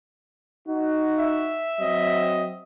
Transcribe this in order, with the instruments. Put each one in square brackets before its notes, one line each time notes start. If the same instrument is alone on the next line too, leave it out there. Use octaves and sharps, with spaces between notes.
[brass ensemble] D#4 F#4
[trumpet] E5
[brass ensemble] F#3 C4 D#5